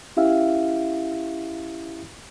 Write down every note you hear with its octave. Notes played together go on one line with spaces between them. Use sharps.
C#4 E4 G4 E5 F5